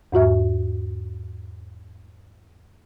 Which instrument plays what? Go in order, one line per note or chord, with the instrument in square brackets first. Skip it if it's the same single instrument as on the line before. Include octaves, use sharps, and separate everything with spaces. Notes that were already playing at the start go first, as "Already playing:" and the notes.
[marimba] E2 G#2 F#4 E5